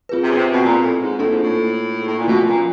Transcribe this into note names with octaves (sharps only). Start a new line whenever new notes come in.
C4 F4 G#4 B4
C3
C#3
C3
B2
A#2
A2
G#2
A2 A#3 D4 F4 A4
G#2
A2
G#2
A2
A#2
B2 F3 A3 C#4 F4
A#2